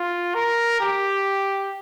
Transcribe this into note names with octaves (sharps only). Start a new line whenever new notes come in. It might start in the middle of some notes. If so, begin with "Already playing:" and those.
Already playing: F4
A#4
G4